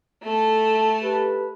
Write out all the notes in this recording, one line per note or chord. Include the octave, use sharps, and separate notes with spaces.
A3 A4
G4 B4